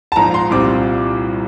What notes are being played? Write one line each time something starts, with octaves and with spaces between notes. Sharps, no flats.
A5
A#1 G#2 F3 A#5
C6
C2 A#2 G3 C4 D6